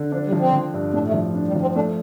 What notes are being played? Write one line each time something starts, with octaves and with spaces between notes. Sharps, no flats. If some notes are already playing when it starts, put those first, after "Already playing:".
Already playing: D3
F3 D4
G3
F3
C4
F3
G2
A2 D4
A3
F3
D4
G3
F3
C4
A3 D4